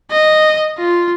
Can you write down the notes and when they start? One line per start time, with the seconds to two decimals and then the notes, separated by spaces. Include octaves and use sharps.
0.11 D#5
0.79 F4